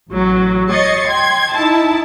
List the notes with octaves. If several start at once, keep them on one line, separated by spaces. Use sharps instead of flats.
A1 F#3
C#5 D#5 G#6 A6 C7 C#7
G5 C6 G#6
D#4 E4 A5